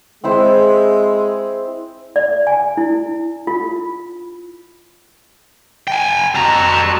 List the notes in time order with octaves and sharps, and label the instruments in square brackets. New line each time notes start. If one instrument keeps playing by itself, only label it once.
[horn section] G#3 [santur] C4 E4 C5
[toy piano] D5
G#5
E4
F4
[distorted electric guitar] G5 G#5
[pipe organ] F2 F#4 A5 [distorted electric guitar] G3 A#5